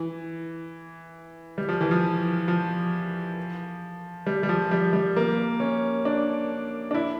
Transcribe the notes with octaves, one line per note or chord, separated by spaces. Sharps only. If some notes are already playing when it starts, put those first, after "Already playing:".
Already playing: E3
G3
F3
E3
F3
F3
G3
G3
F3
G3
G3
A#3
C#4
D4
D4
E4